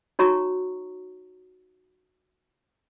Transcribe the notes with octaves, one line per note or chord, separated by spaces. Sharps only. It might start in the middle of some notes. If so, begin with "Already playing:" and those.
D#4 F#4 C#5 A#5 C#6